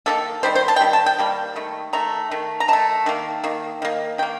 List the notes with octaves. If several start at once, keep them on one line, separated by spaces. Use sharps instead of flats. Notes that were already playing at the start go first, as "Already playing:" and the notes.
D#3 G3 A#3 A4
D#3 G3 C5
C5
A5
G5
D#3 G3
A5
G5
D#3 G3 A#3
D#3 A3
D#3 A3 A#5
D#3 A3
A#5
D#3 A3 A5
D#3 A#3
D#3 A#3
D#3 A#3
D#3 A#3 G5